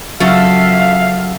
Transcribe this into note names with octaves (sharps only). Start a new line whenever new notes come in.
C#3 F#3 F4 F#4 A4 E5 F5